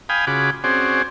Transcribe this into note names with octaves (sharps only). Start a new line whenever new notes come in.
F5 G5 G#5 B5 D#6
C#3 F4 F#4 G#4 B5 D6
C4 C#4 F#4 G#4 C5 D5